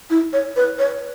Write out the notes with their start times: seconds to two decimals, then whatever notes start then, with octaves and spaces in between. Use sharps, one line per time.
0.10 E4
0.33 C#5
0.56 B4
0.79 C#5